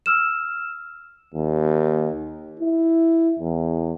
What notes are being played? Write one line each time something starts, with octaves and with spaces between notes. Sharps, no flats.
E6 F6 E7
D#2
E4
E2